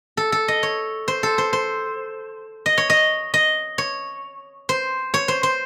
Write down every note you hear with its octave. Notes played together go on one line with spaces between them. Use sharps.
A4
A4
D#5
C#5
C5
A4
C5
C5
D#5
C#5
D#5
D#5
C#5
C5
C#5
C5
C5